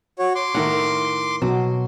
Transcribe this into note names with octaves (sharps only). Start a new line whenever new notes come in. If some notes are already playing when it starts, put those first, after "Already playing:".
F#4 C#5
C6 D6
A2 D#3 E4 A#4 F#5
B2 F#3